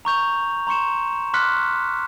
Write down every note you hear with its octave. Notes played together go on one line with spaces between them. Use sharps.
A#5 C#6 G6 F7
A#5 C6 C#6 C#7 E7
C6 D6 F6 F#6 B6 C#7